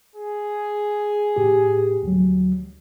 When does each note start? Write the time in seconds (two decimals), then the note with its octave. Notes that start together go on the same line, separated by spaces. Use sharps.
0.16 G#4
1.36 A2 G4
2.03 D2 F#3